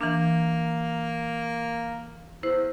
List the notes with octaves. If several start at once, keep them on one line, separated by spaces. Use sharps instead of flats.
E3 A#3 D4
E2 E4 C5